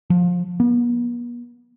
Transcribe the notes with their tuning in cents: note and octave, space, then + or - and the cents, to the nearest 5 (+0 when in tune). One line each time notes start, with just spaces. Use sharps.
F3 +20
B3 -45